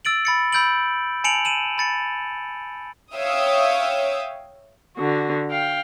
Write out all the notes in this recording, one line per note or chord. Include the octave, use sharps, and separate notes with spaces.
E6 A6 D7 F#7
B5 A6 C#7
B5 E6 G6 A6 D7 F#7
G#5 A5 C#7 D7 F7 F#7
D#7 E7 F#7
B5 A6 C#7
C#5 E5 F5 G5 D#6
D3 F#4
F5 G5